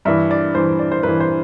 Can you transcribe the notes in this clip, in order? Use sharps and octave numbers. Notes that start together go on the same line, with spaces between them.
G2 E3 E5
D5
G2 E3 C5
D5
C5
G2 B4
E3
C5